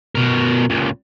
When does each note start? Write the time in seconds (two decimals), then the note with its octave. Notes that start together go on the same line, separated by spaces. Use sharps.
0.15 B2 A#4
0.70 C#2 A#2